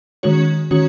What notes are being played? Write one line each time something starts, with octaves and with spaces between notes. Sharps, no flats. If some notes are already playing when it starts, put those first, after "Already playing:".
D#3 G#3 C#4 F#4 C#5
D#3 G#3 C#4 F#4 C#5